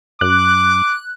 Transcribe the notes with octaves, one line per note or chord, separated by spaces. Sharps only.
F#2 D6 F#6